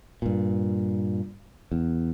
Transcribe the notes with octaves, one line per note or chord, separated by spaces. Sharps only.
G2 A#2
E2